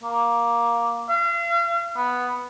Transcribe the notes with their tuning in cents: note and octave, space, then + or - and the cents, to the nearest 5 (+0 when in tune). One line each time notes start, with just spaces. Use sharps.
A#3 +10
F5 -40
B3 +0